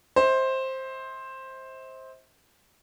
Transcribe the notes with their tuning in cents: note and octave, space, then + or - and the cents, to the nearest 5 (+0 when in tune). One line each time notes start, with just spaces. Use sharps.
C5 +10 E5 -45